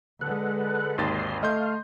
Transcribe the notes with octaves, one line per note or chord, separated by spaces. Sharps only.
D3 G#3 A4 B4 F#5
G#1 D#2 C6 A6
A3 D#5 F5 C6 G6